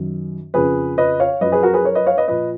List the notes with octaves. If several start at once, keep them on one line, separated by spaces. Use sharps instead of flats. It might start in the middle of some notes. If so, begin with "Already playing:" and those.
Already playing: F#2 D#3
F2 C#3 F3 G#4 B4
B4 D#5
C#5 F5
F#2 F3 B4 D#5
G#4 B4
F#4 A#4
G#4 B4
A#4 C#5
B4 D#5
C#5 F5
B4 D#5
A#2 F3 B4 D#5